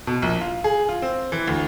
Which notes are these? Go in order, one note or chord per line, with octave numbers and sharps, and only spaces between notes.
B2
A#1
F4
G#4
F4
C4
E3
D2